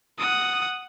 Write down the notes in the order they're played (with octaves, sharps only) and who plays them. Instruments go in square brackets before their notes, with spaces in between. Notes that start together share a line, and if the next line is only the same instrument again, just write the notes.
[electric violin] F#5 D#6